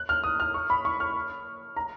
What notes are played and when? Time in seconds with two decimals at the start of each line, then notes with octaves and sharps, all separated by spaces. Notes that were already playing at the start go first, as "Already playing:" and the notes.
Already playing: F#6
0.09 F6
0.24 D#6
0.40 F6
0.54 C#6
0.70 B5
0.85 C#6
1.00 F6
1.77 A#5